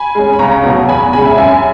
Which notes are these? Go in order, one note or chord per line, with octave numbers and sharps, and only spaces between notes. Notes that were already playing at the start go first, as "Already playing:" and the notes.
Already playing: G#5 B5
G#3 C#4
B5
C#2 A#5 C#6
B2 F#3 B3
E2 G#5 B5
C#3 G#3 G#5 B5
E5 G#5
F#2 E5 G#5